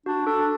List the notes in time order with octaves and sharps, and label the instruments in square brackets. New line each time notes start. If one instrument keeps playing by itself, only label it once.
[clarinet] D4 [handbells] F#4
[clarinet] D4 [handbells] A4